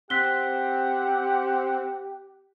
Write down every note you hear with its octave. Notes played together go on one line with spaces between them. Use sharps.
C4 G4 F#5 F#6 B6 G7